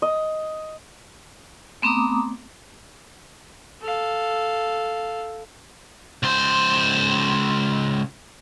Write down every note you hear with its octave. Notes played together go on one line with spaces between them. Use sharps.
D#5
A3 B3 C4 A#5 D6 D#6
A4 F5
C#2 C5